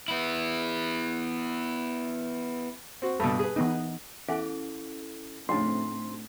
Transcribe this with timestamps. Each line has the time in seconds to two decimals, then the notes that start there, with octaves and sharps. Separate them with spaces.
0.08 B3 E4
3.02 C4 F#4
3.20 G2 B2 A4
3.39 G#4 B4
3.56 E3 B3 D#4
4.28 E2 C#4 E4 A4
5.49 F2 A2 C#3 A3 C4 D4 D#4 C6